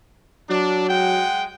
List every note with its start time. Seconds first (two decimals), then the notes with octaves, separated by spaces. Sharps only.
0.50 F#3 D4
0.89 G#3 F#5 G5